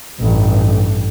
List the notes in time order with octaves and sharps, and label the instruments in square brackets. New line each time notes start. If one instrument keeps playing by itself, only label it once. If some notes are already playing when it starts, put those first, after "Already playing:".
[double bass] A1 G2